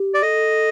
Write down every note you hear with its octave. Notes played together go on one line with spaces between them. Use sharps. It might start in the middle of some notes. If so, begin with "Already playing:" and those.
Already playing: G4
D5
A4 D#5